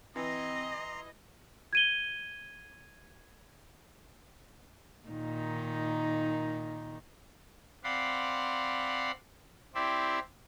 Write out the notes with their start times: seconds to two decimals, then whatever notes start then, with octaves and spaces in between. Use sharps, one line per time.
0.16 E3 C4 D#5 A#5 C6
1.73 G#6 D#7 G7
5.08 A#2 D#3 D#4
7.84 C4 D5 F5 F#5 B5 C6
9.75 C4 E4 G4 C5 D5 E5